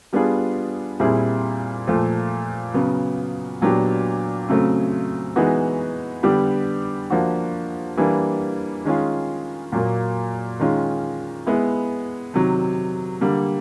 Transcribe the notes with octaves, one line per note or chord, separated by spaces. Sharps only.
G3 B3 D4 F4 G#4
A#2 G3 C4 E4 G#4
A#2 F3 A3
C#3 F#3 B3
A#2 F#3 B3 D4 G4
C#3 F#3 A3 C4
E3 G#3 B3 D#4 F#4
D3 G3 B3 D4 G4
F3 A#3 D4 F#4
E3 G3 A#3 D4
D#3 G#3 C#4 F4 G#4
A#2 F#3 A#3
D#3 G#3 C#4 F4
G#3 B3 E4
C3 D#3 F#3
D3 G3 A#3